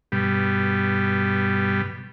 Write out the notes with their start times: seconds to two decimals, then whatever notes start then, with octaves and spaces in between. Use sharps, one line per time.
0.12 G2 B2 G3